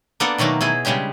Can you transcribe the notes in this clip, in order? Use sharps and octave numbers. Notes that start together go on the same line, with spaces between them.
A#3 B3 D4 A4 D5
B2 D#3 F#3 A3 A#3
B2 E4 G#4
C#3 G3 G#3 D4 G4